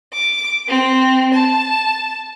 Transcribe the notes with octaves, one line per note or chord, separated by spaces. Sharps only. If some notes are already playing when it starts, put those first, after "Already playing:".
D6
C4
A5